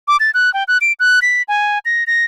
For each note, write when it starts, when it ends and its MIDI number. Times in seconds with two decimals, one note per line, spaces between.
0.08 0.17 86
0.20 0.31 93
0.34 0.53 90
0.54 0.64 79
0.68 0.78 90
0.81 0.93 98
1.00 1.20 90
1.22 1.42 95
1.48 1.79 80
1.85 2.04 94
2.07 2.25 94